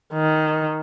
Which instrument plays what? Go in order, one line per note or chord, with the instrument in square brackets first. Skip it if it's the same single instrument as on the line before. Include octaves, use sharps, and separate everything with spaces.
[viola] D#3